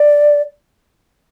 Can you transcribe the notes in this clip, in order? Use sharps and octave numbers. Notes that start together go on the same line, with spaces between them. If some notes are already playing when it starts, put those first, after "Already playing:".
Already playing: D5